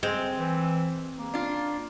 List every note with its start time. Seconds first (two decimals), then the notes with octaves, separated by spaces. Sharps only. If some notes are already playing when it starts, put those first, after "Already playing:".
0.03 G#3 C4
0.39 E3
1.18 A#3
1.34 D4 F4